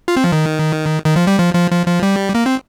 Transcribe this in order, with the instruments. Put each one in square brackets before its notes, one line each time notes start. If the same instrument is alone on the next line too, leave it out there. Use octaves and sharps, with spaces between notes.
[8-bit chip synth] F4
C4
F3
D#3
D#3
F3
G3
F3
F3
F3
F3
G3
A#3
C4